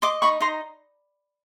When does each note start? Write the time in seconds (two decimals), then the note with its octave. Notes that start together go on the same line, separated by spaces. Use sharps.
0.02 D#5 C6 D6
0.22 D#4 B5 C#6
0.41 D#4 A#5 C6